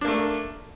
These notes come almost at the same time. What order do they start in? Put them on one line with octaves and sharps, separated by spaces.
D4 A#3 A3